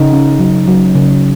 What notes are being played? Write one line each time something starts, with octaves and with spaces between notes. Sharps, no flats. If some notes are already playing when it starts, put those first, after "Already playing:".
Already playing: C#3 D#4
C#4
F#3
F#3
C#3